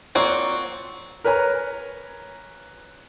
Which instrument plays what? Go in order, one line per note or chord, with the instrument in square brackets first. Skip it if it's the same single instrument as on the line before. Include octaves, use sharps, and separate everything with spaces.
[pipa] A#3 F#4 [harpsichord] C4 [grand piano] F4 C#5 D5
[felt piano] A#4 B4 C#5 G#5 A#5